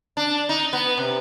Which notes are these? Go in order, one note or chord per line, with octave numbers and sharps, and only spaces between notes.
D4
D#4
B3
C3